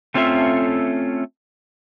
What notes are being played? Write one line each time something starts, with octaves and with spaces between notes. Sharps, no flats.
A3 C4 C#4 F4 A4 E5